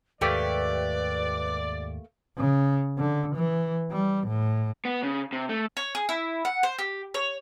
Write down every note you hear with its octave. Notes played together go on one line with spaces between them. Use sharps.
D#2 G#2 A3 A#3 G4 B4 D5
C#3
D3
E3
G3
A2
B3
C#3
C3
A3
C#5
G#4
E4
F#5
C5
G4
C#5